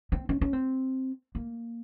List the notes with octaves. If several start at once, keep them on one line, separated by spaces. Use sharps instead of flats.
C4
C#4
C#4
C4
A#3